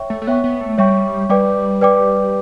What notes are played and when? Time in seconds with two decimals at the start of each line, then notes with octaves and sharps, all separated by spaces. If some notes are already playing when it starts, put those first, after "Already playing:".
Already playing: C#5 E5 G5 C#6
0.10 A3
0.22 A3
0.27 B3 C#5 E5 G5 C#6
0.44 B3
0.61 A3
0.78 G3 C#5 E5 G5 C#6
1.29 G3 B4 D5 G5 D6
1.81 B4 D5 G5 D6